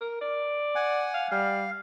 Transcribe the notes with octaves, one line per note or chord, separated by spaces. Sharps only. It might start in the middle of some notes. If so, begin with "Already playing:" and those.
A#4
D5
F#5 G#5
F5
G3 F5